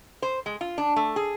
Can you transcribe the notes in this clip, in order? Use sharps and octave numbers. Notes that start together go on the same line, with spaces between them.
C5
G#3
F4
D4
A3
G#4